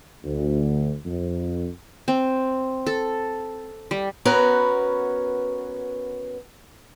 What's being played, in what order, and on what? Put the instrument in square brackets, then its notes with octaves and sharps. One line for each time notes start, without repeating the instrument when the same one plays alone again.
[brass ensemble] D2
F2
[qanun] C4
A4
G3
[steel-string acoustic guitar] B3 C#4 F#4 A#4 B4